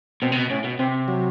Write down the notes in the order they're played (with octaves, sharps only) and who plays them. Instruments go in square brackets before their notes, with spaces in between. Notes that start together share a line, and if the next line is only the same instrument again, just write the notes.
[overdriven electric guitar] B2 [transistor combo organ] C4
[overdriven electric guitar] C3
B2
[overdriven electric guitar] A2 [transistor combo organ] C#4
[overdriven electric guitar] B2
[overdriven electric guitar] C3 [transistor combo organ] C4
[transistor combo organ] F#3